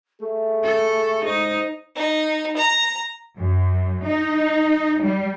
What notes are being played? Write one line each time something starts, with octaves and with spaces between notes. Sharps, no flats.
A3 G#4 E5
A4
G#2 D#4 C5
D#4
A#5
F#2
D#4
G3